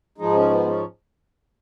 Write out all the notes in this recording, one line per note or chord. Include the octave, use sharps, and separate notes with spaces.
G#2 F3 G#3 D#4
C#4
B3
C#4